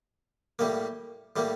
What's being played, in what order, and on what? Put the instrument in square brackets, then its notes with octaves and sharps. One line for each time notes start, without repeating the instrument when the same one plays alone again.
[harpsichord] A2 G3 A#3
A2 G3 A#3